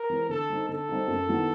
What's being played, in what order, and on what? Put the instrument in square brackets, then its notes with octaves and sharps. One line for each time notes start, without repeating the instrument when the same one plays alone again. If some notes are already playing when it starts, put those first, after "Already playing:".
Already playing: [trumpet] A#4
[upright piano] E3 G#3 C4
[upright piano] D3 [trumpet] A4
[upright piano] G3 C4 D#4
[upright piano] D3 [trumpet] A4
[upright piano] G3 C4 D#4
F#2
D#3 F#3 B3 E4